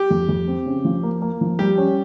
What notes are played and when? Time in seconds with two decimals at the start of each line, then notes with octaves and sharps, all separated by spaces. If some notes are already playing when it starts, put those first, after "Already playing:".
Already playing: G4
0.11 F2
0.29 F2
0.47 C4
0.66 C#3
0.85 F3
1.03 A#3
1.22 A#3
1.41 F3
1.59 G3 G4
1.78 C#4